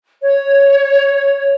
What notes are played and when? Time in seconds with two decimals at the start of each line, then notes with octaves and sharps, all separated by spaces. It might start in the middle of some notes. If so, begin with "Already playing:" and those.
0.23 C#5